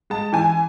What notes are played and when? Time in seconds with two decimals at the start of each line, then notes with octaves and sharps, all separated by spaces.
0.10 G#3 A5
0.33 E3 G#5